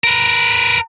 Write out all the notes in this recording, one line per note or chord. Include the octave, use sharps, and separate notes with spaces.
A#4 B4